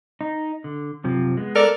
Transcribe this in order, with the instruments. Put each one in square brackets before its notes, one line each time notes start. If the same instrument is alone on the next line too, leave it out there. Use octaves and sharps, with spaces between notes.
[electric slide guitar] D#4
D3
F#2 C3 F3
G#3 B3
[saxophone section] A4 A#4 D5